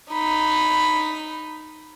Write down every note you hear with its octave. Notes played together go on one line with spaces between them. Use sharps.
D#4 B5